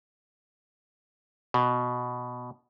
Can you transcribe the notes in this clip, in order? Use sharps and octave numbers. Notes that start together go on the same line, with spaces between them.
B2